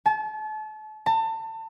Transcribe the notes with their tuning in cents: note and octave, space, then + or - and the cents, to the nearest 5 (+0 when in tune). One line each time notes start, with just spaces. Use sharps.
A5 -35
A5 +30